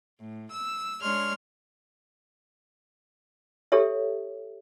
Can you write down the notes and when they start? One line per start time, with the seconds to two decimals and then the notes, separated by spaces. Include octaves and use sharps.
0.19 A2
0.52 E6
1.02 G#3 D4 C#5 C6 F6 G#6
3.72 G4 A4 C#5 E5